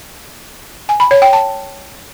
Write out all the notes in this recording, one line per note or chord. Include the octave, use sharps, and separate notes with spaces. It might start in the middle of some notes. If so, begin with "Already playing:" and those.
G#5
B5
C#5
G5
A5